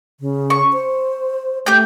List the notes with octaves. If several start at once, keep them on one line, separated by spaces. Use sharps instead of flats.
C#3
C#6
C5
A3 G4 G6